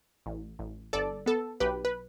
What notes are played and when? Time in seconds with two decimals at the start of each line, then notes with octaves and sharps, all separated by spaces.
0.26 A1
0.59 A1
0.93 G1 A4 D5
1.26 B3 A4
1.60 B1 G4 B4
1.85 B4